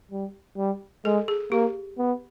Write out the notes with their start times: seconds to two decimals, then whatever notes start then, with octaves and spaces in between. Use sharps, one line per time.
0.11 G3
0.57 G3
1.05 G#3 A4
1.28 G#4
1.51 A#3 G4
1.98 B3